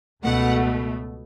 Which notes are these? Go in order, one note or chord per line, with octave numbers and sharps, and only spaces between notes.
C#2 B2 A3 F#5